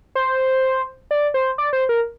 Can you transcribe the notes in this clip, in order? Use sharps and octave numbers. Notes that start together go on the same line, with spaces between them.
C5
D5
C5
D5
C5
A#4